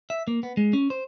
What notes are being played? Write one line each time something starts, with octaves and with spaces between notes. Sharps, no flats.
E5
A#3
B3
G#3
C#4
C5